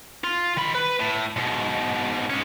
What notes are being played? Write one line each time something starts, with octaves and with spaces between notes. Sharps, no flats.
F4
D#3 B5
B4
A2
G#2 B2
G#3 C#4